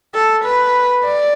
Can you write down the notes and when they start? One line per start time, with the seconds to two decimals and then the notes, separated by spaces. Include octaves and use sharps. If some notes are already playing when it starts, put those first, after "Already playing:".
0.15 A4
0.45 B4
1.05 D5